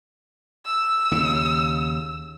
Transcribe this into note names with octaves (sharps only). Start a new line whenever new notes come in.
E6
D#2 C#3